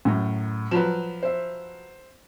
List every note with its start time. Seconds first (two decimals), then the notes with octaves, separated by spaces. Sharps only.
0.05 F#2 A2
0.71 F3 F#3 B4 E7
1.23 C5 E5